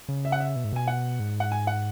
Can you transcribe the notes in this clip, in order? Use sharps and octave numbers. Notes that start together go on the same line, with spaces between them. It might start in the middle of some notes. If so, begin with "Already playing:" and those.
C#3
E5
F#5
E5
B2
G#2
B2 G#5
F#5
G#2
F#5
G#5
F#5